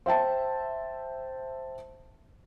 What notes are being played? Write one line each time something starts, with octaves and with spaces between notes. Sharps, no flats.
C5 E5 G5 A5